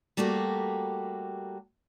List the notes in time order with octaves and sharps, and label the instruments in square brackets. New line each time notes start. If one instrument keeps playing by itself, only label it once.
[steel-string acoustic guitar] G3 A3 A#3 F#4 G4